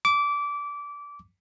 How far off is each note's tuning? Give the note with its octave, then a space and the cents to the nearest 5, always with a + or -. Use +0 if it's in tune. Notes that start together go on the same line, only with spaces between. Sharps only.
D6 -20